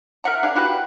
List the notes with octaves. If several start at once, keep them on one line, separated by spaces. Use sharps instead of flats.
A#4 E5 F#5 A#5
D4 G#4 F5
E4 F#4 G4 B4